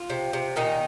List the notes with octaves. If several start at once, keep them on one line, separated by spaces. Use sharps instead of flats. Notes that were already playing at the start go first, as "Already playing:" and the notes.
Already playing: F4
C3
C3
A#2 D#3 D#4